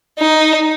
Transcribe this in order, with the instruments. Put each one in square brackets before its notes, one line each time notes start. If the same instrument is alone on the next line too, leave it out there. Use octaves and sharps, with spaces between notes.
[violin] D#4